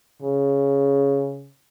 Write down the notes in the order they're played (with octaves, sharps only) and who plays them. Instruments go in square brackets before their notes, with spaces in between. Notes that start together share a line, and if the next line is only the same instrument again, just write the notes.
[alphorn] C#3